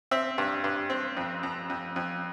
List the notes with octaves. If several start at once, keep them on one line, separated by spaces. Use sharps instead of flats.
C4 E5
G2
G2
C4
F2
F2
F2
F2